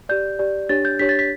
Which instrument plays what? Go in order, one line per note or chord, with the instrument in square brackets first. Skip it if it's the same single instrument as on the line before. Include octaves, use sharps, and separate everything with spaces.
[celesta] G4 D5 G6
G4 D5
D4 G4 C#5 A6
G6
D4 G4 C#5 B6
A6
B6